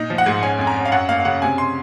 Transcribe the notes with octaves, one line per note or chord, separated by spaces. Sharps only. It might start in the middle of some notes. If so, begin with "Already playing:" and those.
Already playing: A#2 D#4
F3
F#5
G#2
C#4 G#5
F2 G#5
A#5
C#4
F5
F#2 F#5
A#3 F5
F5
C#3 F#5
C3 G#5
C6